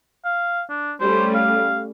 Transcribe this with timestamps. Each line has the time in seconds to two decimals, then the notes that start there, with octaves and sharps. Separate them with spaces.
0.25 F5
0.70 D4
1.01 G3 A3 C#4 C5
1.35 F5